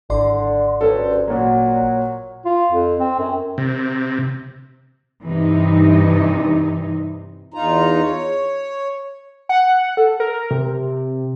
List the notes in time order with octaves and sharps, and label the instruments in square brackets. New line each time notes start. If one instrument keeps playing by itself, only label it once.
[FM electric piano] G#1 D5 C6 [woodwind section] D3
[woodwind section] D2 G2 [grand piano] C#4 A4
[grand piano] A#2 A#3 [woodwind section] F#3
[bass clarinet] F4
F2
C4
F#2
[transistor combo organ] C3
[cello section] G2 C3 E3 D#4
[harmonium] E2 D#4 F4 A#5
C#5
[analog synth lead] F#5
A4
A#4
C3